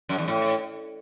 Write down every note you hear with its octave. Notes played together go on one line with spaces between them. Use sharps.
F#2
E2
A2